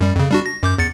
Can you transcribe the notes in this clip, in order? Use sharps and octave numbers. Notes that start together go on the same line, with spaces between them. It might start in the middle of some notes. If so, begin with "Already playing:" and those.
F#2 G3
F2 C#3
G3 D4 F#4
A#6
F#2 D6 G6
E2 A6 C#7